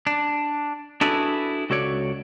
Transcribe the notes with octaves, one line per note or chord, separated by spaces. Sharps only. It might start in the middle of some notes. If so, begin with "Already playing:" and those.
D4
D4 E4 F#4 G#4 A4 B4
C#2 F#4 A4 C#5 D5